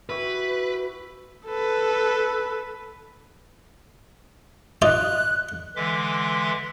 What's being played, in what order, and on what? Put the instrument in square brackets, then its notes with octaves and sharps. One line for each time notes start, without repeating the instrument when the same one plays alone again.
[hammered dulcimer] E4 F#4 G4 [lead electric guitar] B4
[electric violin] A4 B4
[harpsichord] D#4 F4 D5 [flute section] F#6
[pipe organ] D3 E3 G#3 E5 C6 D6